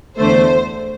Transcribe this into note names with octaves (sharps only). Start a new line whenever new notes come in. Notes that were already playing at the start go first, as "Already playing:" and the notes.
E2 D3 A3 C5